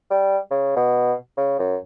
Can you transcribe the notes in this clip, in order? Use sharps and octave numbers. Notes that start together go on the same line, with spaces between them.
G3
C#3
B2
C#3
F#2